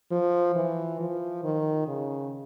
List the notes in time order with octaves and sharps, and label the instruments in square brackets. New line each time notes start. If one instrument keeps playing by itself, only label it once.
[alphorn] F3
E3
F3
D#3
C#3